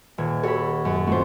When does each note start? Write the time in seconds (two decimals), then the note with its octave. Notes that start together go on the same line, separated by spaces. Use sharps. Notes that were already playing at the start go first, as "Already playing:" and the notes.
0.18 D#1 G#6
0.43 F#4 G4 A4 C#5 B5
0.85 F#2
1.07 F2 A2 F#4 C5